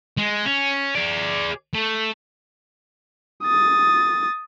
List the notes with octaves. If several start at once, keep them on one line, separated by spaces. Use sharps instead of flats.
G#3
C#4
G#4 D5
A3
D#6 A6